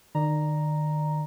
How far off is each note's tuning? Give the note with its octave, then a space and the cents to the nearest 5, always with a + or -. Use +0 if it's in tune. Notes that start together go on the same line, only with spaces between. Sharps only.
D#3 -35 D5 +15 A#5 +0